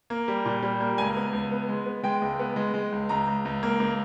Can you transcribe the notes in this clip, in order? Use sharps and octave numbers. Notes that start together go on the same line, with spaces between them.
A#3
G3
A#2
G3
A#3
C#2 G#5
B3
C#2
B3
G#3
B3
G#3 G5
C#2
B3
G#3
G#3
C#2
C#2 A#5
C#2
C#2
A#3
C#2